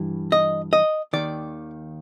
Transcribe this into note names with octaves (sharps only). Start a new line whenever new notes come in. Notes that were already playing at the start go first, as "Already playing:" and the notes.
Already playing: G2 E3
D#5
D#5
D#2 D#3 D5